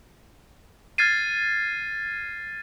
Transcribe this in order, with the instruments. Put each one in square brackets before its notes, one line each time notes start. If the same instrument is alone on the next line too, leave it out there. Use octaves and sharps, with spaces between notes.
[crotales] F6 G#6 A6 C7 D#7